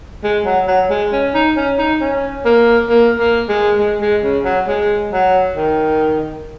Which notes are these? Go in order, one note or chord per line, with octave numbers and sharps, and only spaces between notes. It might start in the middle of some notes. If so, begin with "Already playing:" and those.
G#3
F#3
F#3
G#3
C#4
D#4
C#4
D#4
C#4
A#3
A#3
A#3
G#3
G#3
G#3
C#3
F#3
G#3
F#3
D#3